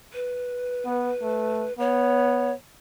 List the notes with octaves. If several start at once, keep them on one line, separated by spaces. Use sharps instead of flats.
B4
B3
A3
B3 C#5